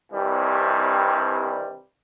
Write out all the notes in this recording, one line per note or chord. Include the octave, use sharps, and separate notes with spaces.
C2 G2 C3 D#3 E3 G3